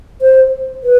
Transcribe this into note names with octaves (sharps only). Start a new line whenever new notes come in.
C5
B4